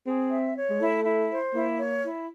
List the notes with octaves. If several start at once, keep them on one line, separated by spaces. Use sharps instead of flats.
C4 G#4
E5
C#5
G#3
A3 E4
E4
C5
A#3 E4
C#5
E4